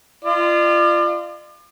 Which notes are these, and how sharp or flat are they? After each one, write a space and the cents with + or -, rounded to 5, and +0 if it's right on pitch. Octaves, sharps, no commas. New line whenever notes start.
F4 -25 D5 +40